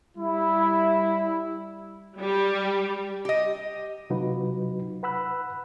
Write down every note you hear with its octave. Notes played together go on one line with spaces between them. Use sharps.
G3 E4
G3 G4
G4 D#5
C3 F#3 D#4 F4 F#4 B4
B4 F#5 B5 E6 F#6